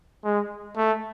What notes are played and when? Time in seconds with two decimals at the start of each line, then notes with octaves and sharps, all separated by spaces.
0.24 G#3
0.77 A3